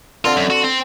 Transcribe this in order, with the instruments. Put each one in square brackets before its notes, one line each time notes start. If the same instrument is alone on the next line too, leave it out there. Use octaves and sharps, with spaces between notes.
[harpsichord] D3 C4 [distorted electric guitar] F4
[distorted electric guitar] F#2
F#4
C4